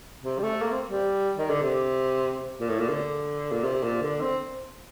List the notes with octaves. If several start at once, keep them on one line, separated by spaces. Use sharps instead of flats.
C3
G3
A3
A#3
C4
G3
D#3
D3
C3
A#2
A2
A#2
D3
A#2
C3
A#2
D3
C4